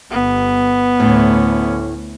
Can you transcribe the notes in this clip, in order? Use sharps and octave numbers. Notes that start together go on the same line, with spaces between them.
G1 B3
D2 A2 C#4